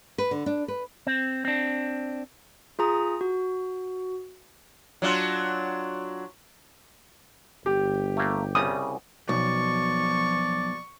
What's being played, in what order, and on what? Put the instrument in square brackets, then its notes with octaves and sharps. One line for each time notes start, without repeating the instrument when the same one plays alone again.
[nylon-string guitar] B4
D3
D4
B4
[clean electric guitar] C4
C4 D4
[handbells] F4 G#4 A#5 D#6
F#4
[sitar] F#3 D4 F4
[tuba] G1 [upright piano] G4
[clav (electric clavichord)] A3 A#3
[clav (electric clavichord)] C2 C#3 G3 [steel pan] D#6
[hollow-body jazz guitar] B1 [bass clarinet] F3 [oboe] D5 [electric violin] C#6